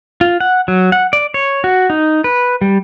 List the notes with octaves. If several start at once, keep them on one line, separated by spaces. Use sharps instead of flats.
F4
F#5
F#3
F#5
D5
C#5
F#4
D#4
B4
G3